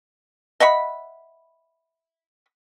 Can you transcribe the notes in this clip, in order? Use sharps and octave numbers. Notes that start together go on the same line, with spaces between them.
D#5 E5 F#5 B5